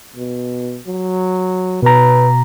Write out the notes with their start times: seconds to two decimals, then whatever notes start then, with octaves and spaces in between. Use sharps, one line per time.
0.16 B2
0.87 F#3
1.83 B2 B4 A#5